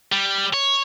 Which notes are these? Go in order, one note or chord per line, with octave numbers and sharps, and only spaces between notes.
G3
C#5